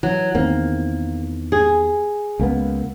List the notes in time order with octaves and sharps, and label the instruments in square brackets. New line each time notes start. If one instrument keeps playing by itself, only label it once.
[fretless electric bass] E3 [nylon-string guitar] F#3
[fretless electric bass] E2 D#3 C4 [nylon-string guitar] A#3
[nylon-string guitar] G#4
[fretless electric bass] C#2 A#3 B3